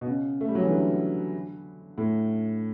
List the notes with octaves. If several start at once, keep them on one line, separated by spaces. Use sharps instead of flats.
B2
C#3
A3
G3
F#3
E3
D3
A2